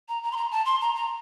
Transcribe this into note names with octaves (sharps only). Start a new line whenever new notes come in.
A#5
A#5
C6
A#5
A5
C6
A#5
A#5